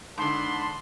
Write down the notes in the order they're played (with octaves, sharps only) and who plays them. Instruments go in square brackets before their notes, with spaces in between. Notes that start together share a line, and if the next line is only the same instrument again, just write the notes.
[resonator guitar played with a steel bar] G#2 D3 [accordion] A5 B5 [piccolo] C6